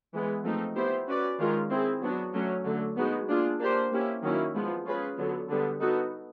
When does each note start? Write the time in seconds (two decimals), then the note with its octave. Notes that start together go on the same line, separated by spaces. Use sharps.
0.13 E3 G#3 B3
0.44 F3 A3 C4 D#4
0.76 B3 E4 G4 C5
1.08 C#4 F#4 B4 D5
1.39 D#3 G#3 C#4 F4 A#4
1.70 C4 E4 G#4
2.01 F#3 B3 D4 F#4
2.33 D3 F#3 A3 C#4
2.65 D3 F#3 A3
2.97 G#3 B3 D#4 F#4
3.29 A#3 D4 F4 G#4
3.60 A#3 D4 G4 C5
3.92 A#3 C#4 E4 G4
4.22 D#3 F#3 A#3 C#4 E4
4.54 F3 G#3 B3
4.86 C#4 F4 G#4 B4
5.18 D3 F#3 B3
5.50 D3 G3 B3
5.80 B3 D#4 F#4 A4